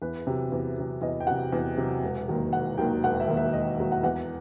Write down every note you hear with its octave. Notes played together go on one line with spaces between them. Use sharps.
E2 B4
C3 F#3
E2
C3 F#3
E2 D#5
G5
C3 F#3 F#5
E2
C3 F#3
E1
D#2 D#3 F#3
E1 F#5
D#2 D#3 F#3 G5
E1 F#5
E5
D#2 D#3 F#3
E5
E1 D#5
D#2 D#3 F#3
F#5
E2 F#5